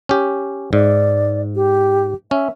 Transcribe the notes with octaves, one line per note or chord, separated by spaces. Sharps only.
C#4 G4
G#2 D5
G4
C#4 E5